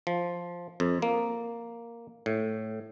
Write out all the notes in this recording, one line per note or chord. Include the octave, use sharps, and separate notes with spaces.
F3
F2
A#3
A2